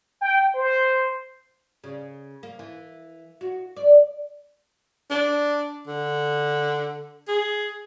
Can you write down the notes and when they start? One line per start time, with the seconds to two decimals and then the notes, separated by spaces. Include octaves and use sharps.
0.21 G5
0.54 C5
1.84 C#3
2.43 A#3
2.59 E3
3.41 F#4
3.76 D5
5.11 D4
5.87 D3
7.28 G#4